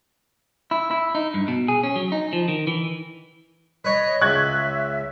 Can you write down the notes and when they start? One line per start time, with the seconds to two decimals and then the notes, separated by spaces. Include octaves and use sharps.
0.71 E4
0.91 E4
1.15 D#4
1.34 G2
1.48 B2
1.68 G#4
1.83 C#4
1.96 F#3
2.12 D#4
2.33 F3
2.48 D#3
2.67 E3
3.85 B4 C#5 D#5
4.21 C#2 E5 C#6 F#6 G#6